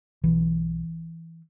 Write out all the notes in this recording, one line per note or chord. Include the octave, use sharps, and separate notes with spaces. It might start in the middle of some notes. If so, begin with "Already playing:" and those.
B1 B2 E3